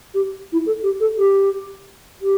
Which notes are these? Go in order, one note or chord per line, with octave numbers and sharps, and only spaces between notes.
G4
E4
A4
G4
A4
G4
G4